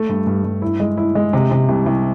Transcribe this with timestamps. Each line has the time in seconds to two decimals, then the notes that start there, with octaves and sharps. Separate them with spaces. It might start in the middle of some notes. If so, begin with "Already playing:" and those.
Already playing: A3
0.09 G2
0.27 G2
0.44 G2
0.62 E4
0.80 G#3
0.97 E4
1.15 G#3
1.33 C3
1.51 C3
1.69 C2
1.86 C2